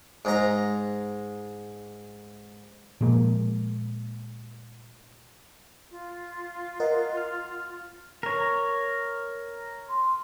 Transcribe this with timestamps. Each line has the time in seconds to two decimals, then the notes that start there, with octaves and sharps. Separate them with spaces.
0.25 G#2 A#5
3.01 A#2 F3 G#3 A#3
5.91 F4
6.80 A#4 D#5 F#5
7.17 F6
8.23 A#4 C#5
9.90 C6